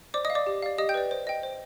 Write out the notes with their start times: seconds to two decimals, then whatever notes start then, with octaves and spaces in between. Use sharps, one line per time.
0.14 C5 D5 D6
0.25 D#5 D#6
0.30 F5
0.35 D5 D6
0.47 G4
0.62 D5 F5
0.78 G4 D#5 D#6
0.89 G5 G6
0.94 B4 D5
1.11 C5
1.27 D#5 G5
1.43 C5